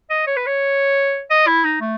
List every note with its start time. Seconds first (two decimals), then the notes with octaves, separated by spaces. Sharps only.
0.10 D#5
0.27 C#5
0.36 B4
0.47 C#5
1.30 D#5
1.47 E4
1.65 D#4
1.81 A3